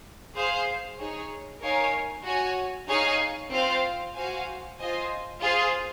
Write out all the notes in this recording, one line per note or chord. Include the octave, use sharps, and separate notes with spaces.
G#4 C5 F5
D#4 G#4 C#5
D#4 A#4 C#5 F5 G#5
F#4 C#5 G#5
D#4 G#4 C#5 F5 G#5
C4 F4 C5 F5
F#4 C5 F5 G#5
F4 C5 D#5 G#5
F4 G#4 C5 F5